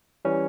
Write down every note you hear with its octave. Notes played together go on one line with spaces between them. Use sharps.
E3 G3 C#4